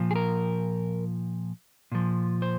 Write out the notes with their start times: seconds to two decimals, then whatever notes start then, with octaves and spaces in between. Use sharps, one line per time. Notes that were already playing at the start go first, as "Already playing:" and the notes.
Already playing: A#2 F3
0.11 G#4
0.16 A#4
1.92 A#2 F3
2.42 C5